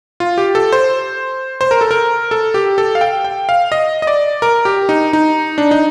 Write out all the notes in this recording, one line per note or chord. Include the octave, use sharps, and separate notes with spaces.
F4
G4
A4
C5
C5
A#4
A4
A#4
A4
G4
A4
F5
G5
G5
F5
D#5
D#5
D5
A#4
G4
D#4
D#4
D4
D#4